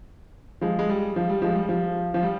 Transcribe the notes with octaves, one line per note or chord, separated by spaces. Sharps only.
F3 G#3
G#3
G3
F3
G3
F3 G#3
G3
F3
F3
G3